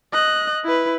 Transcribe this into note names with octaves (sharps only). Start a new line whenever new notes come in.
D#5 F#6
E4 B4